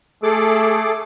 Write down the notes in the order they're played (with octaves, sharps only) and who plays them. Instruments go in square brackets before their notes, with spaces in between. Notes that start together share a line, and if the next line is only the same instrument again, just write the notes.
[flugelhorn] A3 [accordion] G#4 A4 D6